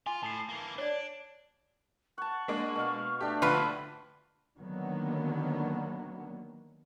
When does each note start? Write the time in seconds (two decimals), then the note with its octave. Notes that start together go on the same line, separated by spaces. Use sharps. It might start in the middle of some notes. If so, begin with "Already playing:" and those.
0.07 F4 G#5
0.23 A2 A5 C7
0.49 E3 A#3
0.78 D4 C#5 D5
2.18 F#5 A5 C#6
2.48 G#3 A#3 D4
2.76 B2 F5
3.20 A3 D4 G4
3.42 A#1 D3 F4 F#4 B4
4.59 D3 D#3 F#3 A#3 B3